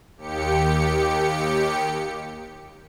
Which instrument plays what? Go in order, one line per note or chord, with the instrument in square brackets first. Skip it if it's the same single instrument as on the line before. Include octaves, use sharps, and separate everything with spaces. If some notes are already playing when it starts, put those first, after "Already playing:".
[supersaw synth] D#2 G4 C#7